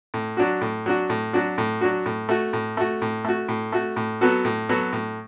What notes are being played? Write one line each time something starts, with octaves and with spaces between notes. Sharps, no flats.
A2
F#3 D4 F#4
A2
F#3 D4 F#4
A2
F#3 D4 F#4
A2
F#3 D4 F#4
A2
A3 F#4
A2
A3 F#4
A2
A3 F#4
A2
A3 F#4
A2
F#3 B3 F#4 A4
A2
F#3 B3 F#4 A4
A2